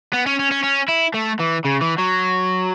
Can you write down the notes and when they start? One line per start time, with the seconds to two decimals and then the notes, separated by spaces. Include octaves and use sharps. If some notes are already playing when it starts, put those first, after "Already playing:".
0.13 B3
0.26 C#4
0.39 C#4
0.51 C#4
0.64 C#4
0.89 E4
1.14 A3
1.40 E3
1.65 C#3
1.81 E3
1.98 F#3